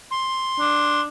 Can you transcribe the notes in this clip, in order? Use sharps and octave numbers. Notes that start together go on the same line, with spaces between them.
C6
D4